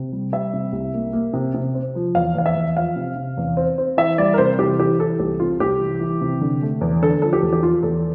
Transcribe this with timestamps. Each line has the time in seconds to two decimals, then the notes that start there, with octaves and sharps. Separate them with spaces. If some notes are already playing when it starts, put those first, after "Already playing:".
Already playing: C3
0.12 G3
0.32 G3 E5
0.53 C3
0.73 C2
0.94 A#3
1.13 A#3
1.33 C3
1.54 C3
1.74 C4
1.95 F3
2.15 E2 F5
2.35 E2 F5
2.46 E5
2.55 E2
2.77 F3 F5
2.96 C3
3.16 C3
3.37 E2
3.57 C4
3.78 C4
3.97 E3 E5
4.18 G3 D5
4.34 A#4
4.38 C3 C5
4.58 E3 G4
4.79 E3 G4
4.99 E3 A4
5.19 C2 G4
5.39 C3 F4
5.60 C2 G4
5.80 E3
6.01 E3
6.21 C3
6.41 D3
6.62 A3
6.81 E2
7.02 D3 A4
7.22 F3 A4
7.33 G4
7.42 E2
7.53 G4
7.63 F3 F4
7.83 E2 A4